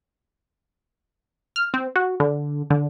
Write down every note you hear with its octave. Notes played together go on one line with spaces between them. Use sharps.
F6
C4
F#4
D3
D3